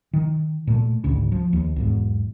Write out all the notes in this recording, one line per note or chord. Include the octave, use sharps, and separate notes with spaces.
D#3
A#2 A3
G#1 D2 C#3
F3
D#2
B1 E2 G#2